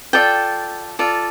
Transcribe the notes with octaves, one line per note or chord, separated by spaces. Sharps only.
F4 A4 D5 G5
F4 A4 D5